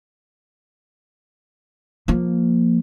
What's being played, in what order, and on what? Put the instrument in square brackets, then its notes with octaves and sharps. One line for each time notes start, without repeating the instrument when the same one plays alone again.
[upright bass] F3 A#3